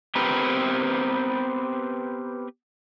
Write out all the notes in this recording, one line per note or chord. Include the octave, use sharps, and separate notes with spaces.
B3 C4 G4 A#4 B4